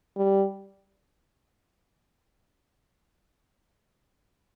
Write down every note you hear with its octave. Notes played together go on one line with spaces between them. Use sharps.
G3